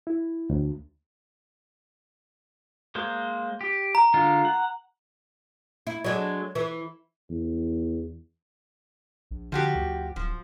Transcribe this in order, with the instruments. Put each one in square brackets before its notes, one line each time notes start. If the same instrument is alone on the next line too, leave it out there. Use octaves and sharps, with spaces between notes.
[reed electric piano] E4
D2
[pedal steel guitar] G#3 A#3 C5
G4
[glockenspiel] A#5
[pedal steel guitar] D3 G#3 F4
F#5
[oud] E4
F#3 G#3 D4
E3
[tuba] E2
[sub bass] A#1
[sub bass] D3 [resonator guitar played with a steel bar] F3 F#4 G4
[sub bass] D2
[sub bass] D1 [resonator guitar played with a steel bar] F3